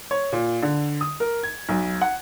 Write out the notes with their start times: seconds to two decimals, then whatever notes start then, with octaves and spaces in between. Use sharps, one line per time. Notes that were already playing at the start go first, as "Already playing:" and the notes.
0.11 C#5
0.32 A#2
0.62 D3
1.01 D#6
1.20 A#4
1.43 G#6
1.69 B1
2.01 F#5